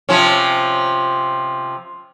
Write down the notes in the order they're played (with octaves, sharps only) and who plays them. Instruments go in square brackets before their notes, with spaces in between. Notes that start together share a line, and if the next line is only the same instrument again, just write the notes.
[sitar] C3 F3 C#4